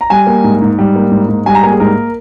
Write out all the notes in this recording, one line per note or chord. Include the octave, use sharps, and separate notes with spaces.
A#5
G3 G#5
A#3
G#2
G#2
G3
A#3
G#2
G#2
G3 G#5
A#5
A#3 G#5
G#4
G#2 A#4